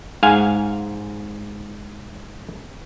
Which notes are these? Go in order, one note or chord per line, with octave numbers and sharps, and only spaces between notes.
G#2 F5 F#5 G#5